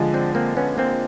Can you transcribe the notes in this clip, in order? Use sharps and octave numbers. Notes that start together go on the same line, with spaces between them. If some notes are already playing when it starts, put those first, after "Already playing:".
Already playing: D3 F3 G#3
C4 D4
A#3 C4
B3 C#4
A#3 C4